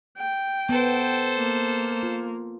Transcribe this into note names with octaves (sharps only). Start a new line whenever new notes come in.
G5
B3 A4 C5
A#3
F4